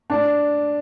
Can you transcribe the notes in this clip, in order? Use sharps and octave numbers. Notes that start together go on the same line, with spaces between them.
D4